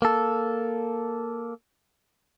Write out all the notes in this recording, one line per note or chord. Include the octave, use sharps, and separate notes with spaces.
A#3 A4